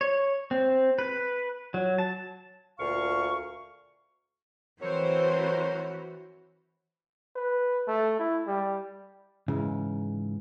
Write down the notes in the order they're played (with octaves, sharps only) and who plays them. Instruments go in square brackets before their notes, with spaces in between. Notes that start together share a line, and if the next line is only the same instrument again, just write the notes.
[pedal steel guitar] C#5
C4
B4
F#3
A5
[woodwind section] D2 A#2 F5 C#6
[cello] E3 F#4 [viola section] C4 C5 [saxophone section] A#4 C#5
[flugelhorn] B4
A3
E4
G3
[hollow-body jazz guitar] G#2 C#3 E3